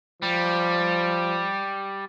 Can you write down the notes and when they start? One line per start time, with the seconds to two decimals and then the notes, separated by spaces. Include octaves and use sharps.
0.22 F3 G3